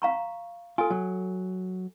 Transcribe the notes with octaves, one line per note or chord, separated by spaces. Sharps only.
F5 A#5 C#6
F4 A4 G#5
F#3